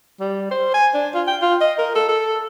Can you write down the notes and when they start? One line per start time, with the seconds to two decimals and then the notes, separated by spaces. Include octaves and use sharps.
0.20 G3
0.51 C5
0.74 G#5
0.94 D4
1.14 F4
1.27 G5
1.42 F4
1.61 D#5
1.78 A#4
1.95 A4
2.09 A4